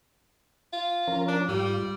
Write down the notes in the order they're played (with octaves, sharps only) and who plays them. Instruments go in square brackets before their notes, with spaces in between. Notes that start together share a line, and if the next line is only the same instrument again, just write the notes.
[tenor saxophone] F4
[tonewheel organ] F3 C#4 A#4
[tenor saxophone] D4
[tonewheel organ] G#2 F4 [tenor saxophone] G3